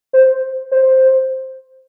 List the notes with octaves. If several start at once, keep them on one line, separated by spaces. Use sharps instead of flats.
C5
C5